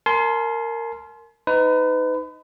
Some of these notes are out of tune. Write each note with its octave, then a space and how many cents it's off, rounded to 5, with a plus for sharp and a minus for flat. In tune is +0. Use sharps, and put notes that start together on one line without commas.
A#4 -15 G#5 +45 C6 +0
D#4 +10 B4 +35